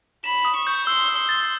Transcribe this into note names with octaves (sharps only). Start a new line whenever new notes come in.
B5 E7
D#6
C#6
G6
C6 E6
E6
C6
A6